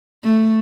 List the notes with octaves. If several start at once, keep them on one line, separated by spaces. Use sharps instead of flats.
A3